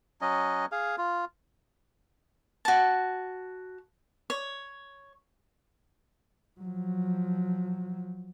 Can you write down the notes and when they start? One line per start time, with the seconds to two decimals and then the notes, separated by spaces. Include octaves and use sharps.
0.21 F#3 C#4 D#5
0.72 G#4 F5
0.98 F4
2.65 F#4 A5
4.30 C#5
6.61 F3 F#3